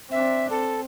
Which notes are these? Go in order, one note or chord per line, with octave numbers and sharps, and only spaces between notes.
C4 D4 E5
C4 A4